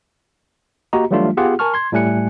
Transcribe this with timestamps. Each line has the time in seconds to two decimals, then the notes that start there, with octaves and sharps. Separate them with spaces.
0.93 A#3 F#4 G4 D#5 A#5
1.11 E3 F#3 G3 A3 D4 F4
1.37 B3 F4 G4 G#4 F#5
1.59 A#4 G#5 A5 C#6 F6
1.74 C6 G#6
1.92 A2 G3 A3 G#5 F#6 C#7